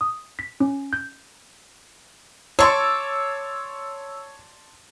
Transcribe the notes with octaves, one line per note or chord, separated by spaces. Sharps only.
D#6
B6
C#4
G6
C#5 D5 A5 C6 C#6 E6